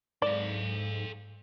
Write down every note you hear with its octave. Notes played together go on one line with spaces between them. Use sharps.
G#2 A4 D5 F5